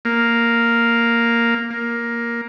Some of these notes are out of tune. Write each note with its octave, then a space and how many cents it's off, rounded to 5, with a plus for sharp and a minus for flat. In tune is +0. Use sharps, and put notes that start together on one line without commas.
A#3 +0
A#3 +10